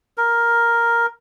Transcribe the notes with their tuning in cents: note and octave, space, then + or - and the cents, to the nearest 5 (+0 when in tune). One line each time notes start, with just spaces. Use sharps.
A#4 +5